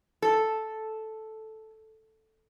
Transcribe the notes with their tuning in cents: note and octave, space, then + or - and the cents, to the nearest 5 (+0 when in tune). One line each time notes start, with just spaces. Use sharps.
A4 -5